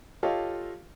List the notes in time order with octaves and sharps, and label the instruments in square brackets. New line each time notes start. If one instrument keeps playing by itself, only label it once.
[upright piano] F4 G4 A4 C#5 D#5 F5